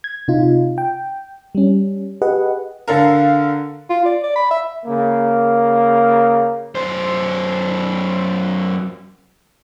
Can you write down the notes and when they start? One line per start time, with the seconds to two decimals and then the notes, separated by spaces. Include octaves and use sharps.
0.04 G#6
0.28 C3 D#4 F4
0.78 G5
1.55 G3 C#4
2.22 G4 G#4 B4 D#5 F#5
2.88 D3 A4 A#4 F5
3.90 F4
4.05 D5
4.24 D5
4.36 B5
4.51 E5
4.86 C#3 A#3
6.75 F#2 C5